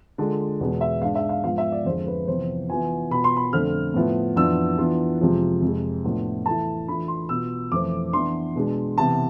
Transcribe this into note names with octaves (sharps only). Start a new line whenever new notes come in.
D3 G#3 D4 F4
E2 B2 G#3 B3
E5
G#2 G#3 D4 F5
E5
F5
G#2 F3 B3 F4 F5
E5
D5
F2 D3 G#3 C4 C5
B4
F2 C3 E3 B3 C5
E3 B3 F4 G#5
B2 B3 F4 B5
C6
B5
F2 D3 A3 C4 F6
A2 F3 B3 E4
F2 E3 B3 D4 F4 E6
E3 B3 D4 F4
F2 C3 F3 G#3
F2 C3 G#3
A2 F3 B3 D4 F4
E3 A3 E4 A5
E3 A3 D4 F4 B5
C6
B2 B3 F4 E6
F2 E3 A3 C4 D6
E3 B3 D4 C6
B2 G#3 D4
C3 E3 B3 A5